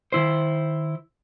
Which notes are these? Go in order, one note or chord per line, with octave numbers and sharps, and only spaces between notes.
D#3 E4 C5